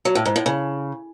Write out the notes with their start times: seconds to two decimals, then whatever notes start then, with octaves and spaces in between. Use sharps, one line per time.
0.05 F#3
0.15 A2
0.25 G#2
0.36 A2
0.46 C#3